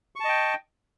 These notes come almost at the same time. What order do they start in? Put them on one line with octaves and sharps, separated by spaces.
C#6 A5 D#5 G5